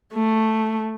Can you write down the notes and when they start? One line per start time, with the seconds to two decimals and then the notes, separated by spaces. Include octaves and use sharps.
0.13 A3